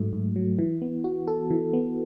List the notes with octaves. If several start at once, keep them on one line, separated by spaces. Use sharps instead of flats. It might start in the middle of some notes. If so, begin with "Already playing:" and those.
Already playing: G#2 F#3 A3
G#2
F#3
E3
B3
F#4
A4
E3
B3